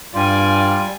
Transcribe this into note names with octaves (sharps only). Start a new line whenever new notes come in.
G2 G3 F4 D5 G#5